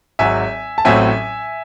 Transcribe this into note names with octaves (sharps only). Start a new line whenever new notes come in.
G#1 G#2 F#3 E5 G#5
A5
A1 A2 F#3 C4 E5 G#5